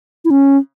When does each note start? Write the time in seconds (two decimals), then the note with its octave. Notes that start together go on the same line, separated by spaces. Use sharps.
0.25 E4
0.31 C#4